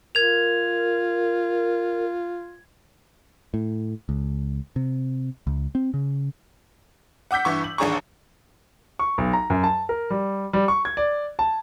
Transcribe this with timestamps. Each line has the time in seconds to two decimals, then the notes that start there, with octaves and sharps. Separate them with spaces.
0.15 F4 A#4 G#6 F7
3.54 A2
4.09 C#2
4.76 C3
5.47 C#2
5.75 C4
5.94 C#3
7.31 F#5 D6 E6 G6 B6
7.45 G2 E3 C#6
7.64 F#7
7.78 A1 D#2 D4 G#4 A#5 C#6
8.99 C#6
9.18 B1
9.33 A#5
9.50 F#2
9.64 A5
9.89 A#4
10.10 G3
10.53 G3
10.68 C#6
10.85 G#6
10.97 D5
11.39 A5